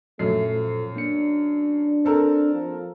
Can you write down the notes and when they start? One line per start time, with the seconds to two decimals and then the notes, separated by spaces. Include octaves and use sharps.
0.19 F#2 A#2 A3 A4 C7
0.53 F3
0.96 A#3 D4 C#7
2.05 C4 A4 A#4
2.53 F3